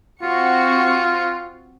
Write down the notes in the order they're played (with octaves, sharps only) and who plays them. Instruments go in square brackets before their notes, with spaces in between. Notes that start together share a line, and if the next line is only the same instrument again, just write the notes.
[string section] C4 F#4 C#7 [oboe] F4